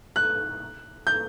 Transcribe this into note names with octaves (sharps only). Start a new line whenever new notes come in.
F#6
G6